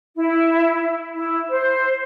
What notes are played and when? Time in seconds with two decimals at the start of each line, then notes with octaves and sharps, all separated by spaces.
0.16 E4
1.15 E4
1.49 C5